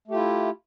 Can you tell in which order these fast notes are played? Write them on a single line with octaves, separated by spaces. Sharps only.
A3 G4 F4 E4